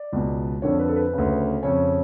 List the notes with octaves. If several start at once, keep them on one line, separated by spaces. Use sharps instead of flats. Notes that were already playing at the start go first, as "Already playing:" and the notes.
Already playing: D5
C#2 B2
F2 D3 C#5
B4
A4
B4
D2 C#3
F2 C#3 C#5